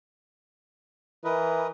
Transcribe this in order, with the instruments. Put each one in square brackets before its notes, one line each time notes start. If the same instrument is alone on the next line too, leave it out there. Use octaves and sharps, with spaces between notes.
[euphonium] E3 [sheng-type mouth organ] A#4 B4 D#5